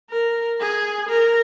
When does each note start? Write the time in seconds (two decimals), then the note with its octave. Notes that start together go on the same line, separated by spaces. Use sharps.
0.10 A#4
0.60 G#4
1.09 A#4